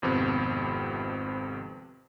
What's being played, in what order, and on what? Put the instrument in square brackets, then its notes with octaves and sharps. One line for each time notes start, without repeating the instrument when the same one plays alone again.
[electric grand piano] G#1 F2 C3 B3 C4